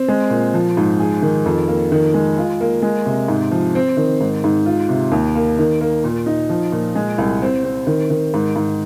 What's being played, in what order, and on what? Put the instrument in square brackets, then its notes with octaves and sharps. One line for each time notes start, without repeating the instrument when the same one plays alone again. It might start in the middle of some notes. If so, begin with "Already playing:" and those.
Already playing: [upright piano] C4
G#3
A#2
F3
G#2
G#4
D#3
F2
A#3
D#3
G#3
F4
A#3
G#3
C3
G#2
F3
C4
D#3
G#2
G#2
F4
C3
D#2
A#3
D#3
A#3
A#2
D#4
F3
A#2
G#3
C2
C4
C4
D#3
D#3
G#2
G#2